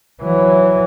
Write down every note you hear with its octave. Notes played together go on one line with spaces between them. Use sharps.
E3 F#3